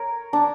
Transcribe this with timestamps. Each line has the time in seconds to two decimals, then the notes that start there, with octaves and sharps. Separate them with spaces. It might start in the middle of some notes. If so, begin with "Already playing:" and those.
Already playing: A#4 C#5
0.33 D4